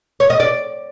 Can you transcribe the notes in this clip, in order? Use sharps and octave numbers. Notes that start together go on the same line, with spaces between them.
C#5
D#5
D5